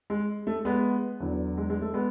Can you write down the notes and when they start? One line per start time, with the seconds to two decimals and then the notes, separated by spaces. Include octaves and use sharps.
0.10 G#3
0.47 A3
0.65 G#3 B3
1.20 E2 D3 F#3
1.57 G#3
1.70 G#3
1.82 A3
1.94 G#3 B3